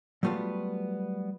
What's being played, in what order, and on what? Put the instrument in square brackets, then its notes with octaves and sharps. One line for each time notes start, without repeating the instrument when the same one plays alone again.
[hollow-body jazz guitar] F#3 G3 A3 B3 F4